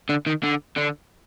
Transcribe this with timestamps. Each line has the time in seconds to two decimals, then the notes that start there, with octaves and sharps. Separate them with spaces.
0.09 D3
0.26 D#3
0.44 D3
0.77 D3